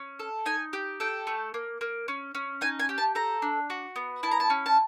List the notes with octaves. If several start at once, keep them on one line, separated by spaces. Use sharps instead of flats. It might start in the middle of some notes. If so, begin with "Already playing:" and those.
Already playing: C#4
A4
D#4 G#5
G4
A4 G5
A3
A#3
A#3
C#4
C#4
D#4 G#5
G#5
G4
A5
A4 A#5
D4
F#4
B3
E4 A5
A#5
A5
C#4
A5